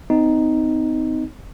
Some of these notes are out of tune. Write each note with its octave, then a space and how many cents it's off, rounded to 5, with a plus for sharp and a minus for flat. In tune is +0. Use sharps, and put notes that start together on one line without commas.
C4 -40 D#4 +0